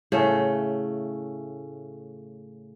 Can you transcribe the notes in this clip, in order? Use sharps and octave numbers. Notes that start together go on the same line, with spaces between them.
A2 C#3 A3